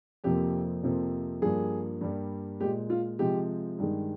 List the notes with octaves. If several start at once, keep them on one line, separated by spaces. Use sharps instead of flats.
F2 C3 F3 A#3 G4
F2 C3 F3 A#3
G2 F3 A#3 G#4
G2 G3 A#3
A#2 G#3 G4
F4
C3 F3 G#3 G4
G2 D#3 G#3